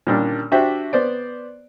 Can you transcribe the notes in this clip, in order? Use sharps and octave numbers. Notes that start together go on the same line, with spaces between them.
A#2 D#3 G3 C#4 D4
D4 F#4 G4 C5 E5 G5
B3 C5 D5